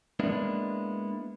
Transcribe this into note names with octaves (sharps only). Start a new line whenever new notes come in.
G#3 A#3 B3 D4 E4